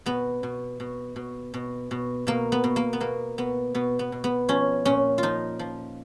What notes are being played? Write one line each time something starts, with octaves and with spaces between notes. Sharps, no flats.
B2 B3
B2
B2
B2
B2
B2
B2 A#3
B3
B2
A#3
B3
B2 A#3
B2 B3
B2 B3
B3
B2
B3
F3 C#4
A#2 C#4
F4
F3 D#4
F3